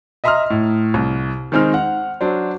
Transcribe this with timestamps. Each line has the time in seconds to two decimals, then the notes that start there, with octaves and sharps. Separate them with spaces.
0.24 D#5 E5 A#5 C6 D#6 F6
0.50 A2
0.94 C2
1.52 D#3 G#3 C4 D#4 F6
1.74 F#5
2.21 F#3 D4 C5